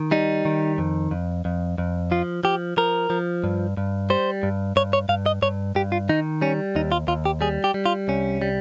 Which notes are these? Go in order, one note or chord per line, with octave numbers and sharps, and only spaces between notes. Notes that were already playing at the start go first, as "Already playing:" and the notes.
Already playing: D#3
G3 D#4
D#3
F2
F2
F2
F2
F3 F4
F3 G4
F3 A#4
F3
G2
G2
G3 C5
G2
G2 C#5
C#5
G2 F5
D#5
G2 C#5
G2 G4
F4
D#3 D#4
G3 C#4
D#2 D#4
F4
D#2 F4
G4
G3 G#4
G4
G3
F4
C2 C#4
G3